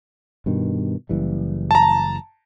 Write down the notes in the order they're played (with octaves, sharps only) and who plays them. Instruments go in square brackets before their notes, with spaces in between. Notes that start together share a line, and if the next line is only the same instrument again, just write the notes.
[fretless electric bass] G2 B2 D#3
F#1 E3 G3
[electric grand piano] A5 A#5